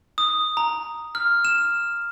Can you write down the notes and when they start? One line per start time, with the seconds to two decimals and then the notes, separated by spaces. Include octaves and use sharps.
0.18 D#6
0.57 A#5
1.15 F6
1.45 E7